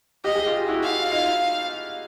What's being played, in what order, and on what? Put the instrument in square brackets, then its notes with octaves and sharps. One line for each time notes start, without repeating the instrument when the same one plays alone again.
[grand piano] G4 [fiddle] D#5
[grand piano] G#4
F4 G4
E4 F#4
[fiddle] F5
[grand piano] D#4 F4